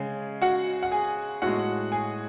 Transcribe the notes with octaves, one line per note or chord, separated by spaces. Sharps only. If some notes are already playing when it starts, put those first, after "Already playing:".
Already playing: C#3 G#3 G#4 G#5
F#4 F#5
F#5
G#4 G#5
A2 G#3 F#4 F#5
G#4 G#5